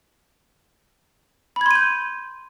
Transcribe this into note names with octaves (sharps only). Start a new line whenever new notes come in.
B5 C6 G6 G#6 D#7